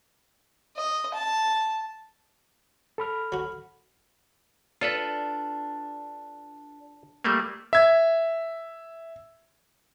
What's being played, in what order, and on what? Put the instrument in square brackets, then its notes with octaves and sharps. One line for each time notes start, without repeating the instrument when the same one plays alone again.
[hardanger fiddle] D#5
A5
[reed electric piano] A4 B5 F6
[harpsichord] F#3 F#4
[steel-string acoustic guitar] D4 [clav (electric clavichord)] F4 A4 B4
[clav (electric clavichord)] G3 A3 A#3
[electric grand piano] E5 G#6